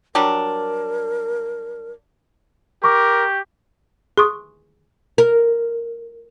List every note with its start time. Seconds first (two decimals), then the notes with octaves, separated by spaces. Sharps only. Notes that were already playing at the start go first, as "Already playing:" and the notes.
0.15 F#3 G3 D4 A#4
2.84 G4 A#4 C#6 D6
4.18 G#4 C6 C#6 D#6
5.18 A#4